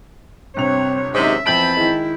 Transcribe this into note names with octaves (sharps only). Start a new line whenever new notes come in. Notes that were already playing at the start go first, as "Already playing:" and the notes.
G1 C3 C4 C#5 F7
G#2 C3 D#3 F#3 C#4 D#4 E5
F2 E3 B3 C4 A5 B5 G6 D7
D#3 G#3 E4